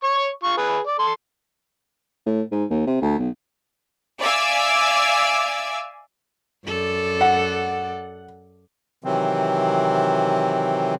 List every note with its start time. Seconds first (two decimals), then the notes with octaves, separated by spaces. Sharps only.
0.04 C#5 C#6
0.44 F4 C#6
0.57 G#4 B4
0.87 D5
0.99 A4 C6
2.26 A2
2.52 G#2
2.70 D#2
2.86 C3
3.02 D2
3.19 B1
4.19 D5 E5 F5 G#5 D6 E6
6.66 F#2 A4 D5
7.21 F#5
9.04 C3 D#3 E3 F#3 C4